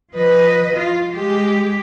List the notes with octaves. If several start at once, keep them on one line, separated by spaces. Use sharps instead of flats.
F3 B4 D#5
F4
G#3 G4